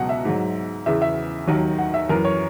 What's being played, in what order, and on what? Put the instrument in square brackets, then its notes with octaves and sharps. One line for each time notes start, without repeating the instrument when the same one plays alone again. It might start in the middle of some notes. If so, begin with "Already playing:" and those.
Already playing: [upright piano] C#2 B2 F#3 F#5
E5
G#2 F#3
E2 C#3 E3 E5
E5
D#2 D#3 F#3
F#5
E5
F#2 E3 A#4
C#5